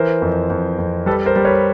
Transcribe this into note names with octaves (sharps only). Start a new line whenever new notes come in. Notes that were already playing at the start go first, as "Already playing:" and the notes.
Already playing: E3 A#4 C5
F2
F2
F2
G3 A4 B4
A#4 C5
G3
B4 C#5